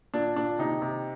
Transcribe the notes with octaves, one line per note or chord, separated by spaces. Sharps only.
A#2 D4
A#2 D4
C3 D#4
C3